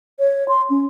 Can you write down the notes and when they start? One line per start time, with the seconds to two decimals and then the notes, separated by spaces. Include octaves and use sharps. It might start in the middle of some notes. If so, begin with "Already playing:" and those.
0.19 C#5
0.48 C6
0.70 C#4